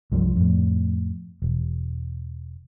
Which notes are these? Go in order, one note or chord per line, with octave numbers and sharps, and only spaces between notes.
C2 G2 F3 G3
F2 A2
E1